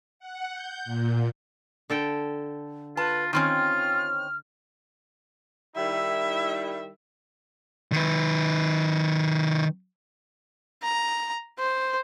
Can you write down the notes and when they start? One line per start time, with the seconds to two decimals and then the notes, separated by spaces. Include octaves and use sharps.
0.19 F#5
0.52 G6
0.85 A#2
1.90 D3 A4 G5
2.97 F4 B4 A5
3.33 D#3 C4 C#4 F4 F6
5.76 D#3 G3 E4 E5
7.92 D#3 B4
10.83 A#5
11.59 C5